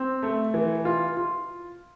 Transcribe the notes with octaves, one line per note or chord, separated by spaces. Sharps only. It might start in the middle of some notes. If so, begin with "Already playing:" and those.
Already playing: C4
A3
E3
F4
F4